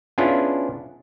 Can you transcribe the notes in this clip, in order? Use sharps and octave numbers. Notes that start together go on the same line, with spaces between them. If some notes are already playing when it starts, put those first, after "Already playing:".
B3 C#4 D4 E4 F4 G#4